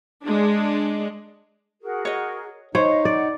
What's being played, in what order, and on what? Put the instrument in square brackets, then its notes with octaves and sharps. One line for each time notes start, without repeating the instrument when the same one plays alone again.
[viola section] G#3 D4
[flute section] F#4 G#4 A#4
[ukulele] C#5 D#5
[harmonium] D#4 [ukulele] C5 [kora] C#5 [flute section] D#5 F5
[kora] D5 [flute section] F#5